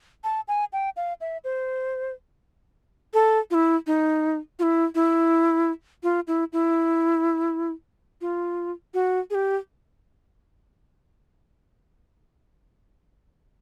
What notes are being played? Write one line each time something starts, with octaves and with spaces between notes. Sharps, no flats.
A5
G#5
G5
F5
E5
C5
A4
F4
E4
D#4
F4
E4
E4
F4
E4
E4
F4
F#4
G#4
G4